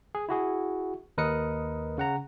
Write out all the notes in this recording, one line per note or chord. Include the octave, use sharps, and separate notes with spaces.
G#4
E4 F#4 G#4
D#2 A#4 B4 D#5 D#6 C#7
C#3 F#5 A#5